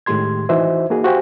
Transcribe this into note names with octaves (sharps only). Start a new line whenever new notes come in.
A2 D#3 G#3 G4 C6 G#6
E3 D#4 F#4 C5 E5
A#3 D#4 F#4 G#4
F#4 G4 C5 F5 G5 G#5